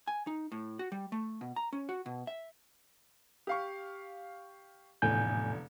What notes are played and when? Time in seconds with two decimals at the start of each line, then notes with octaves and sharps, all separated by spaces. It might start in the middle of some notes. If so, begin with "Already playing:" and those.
0.07 G#5
0.27 D#4
0.52 A2
0.79 F#4
0.92 G3
1.12 A3
1.41 B2
1.56 A#5
1.73 C#4
1.89 F#4
2.06 B2
2.27 E5
3.47 G4 F5 C#6
5.02 F1 E2 A2 D3 G#5 G6